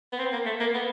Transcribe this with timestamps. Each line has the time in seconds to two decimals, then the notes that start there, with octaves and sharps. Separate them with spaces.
0.13 B3
0.19 C4
0.32 A#3
0.45 A3
0.60 A#3
0.74 B3